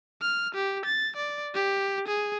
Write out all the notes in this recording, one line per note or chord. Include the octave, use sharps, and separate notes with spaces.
F6
G4
A6
D5
G4
G#4